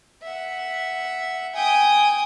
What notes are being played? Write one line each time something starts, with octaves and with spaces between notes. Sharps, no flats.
E5 F#5
G5 G#5 D#6